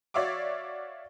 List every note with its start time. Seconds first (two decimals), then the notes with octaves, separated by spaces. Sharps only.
0.14 F#4 C#5 D5 E5 F5 D6